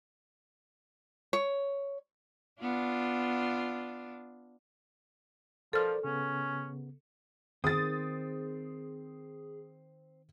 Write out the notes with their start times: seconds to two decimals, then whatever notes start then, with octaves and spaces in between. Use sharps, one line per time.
1.33 C#5
2.61 B3 D4 F4
5.73 F3 A4 A#4 C5 D5 F6
6.04 C#3 B3 C#4
7.64 D#3 C4 G#4 C5 D#6 A6